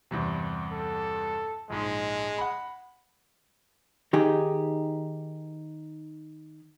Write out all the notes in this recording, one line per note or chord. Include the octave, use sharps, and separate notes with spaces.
E2 G2 C3
A4
A#1 G#2 G#3
F#5 B5
D#3 D#4 G4 G#4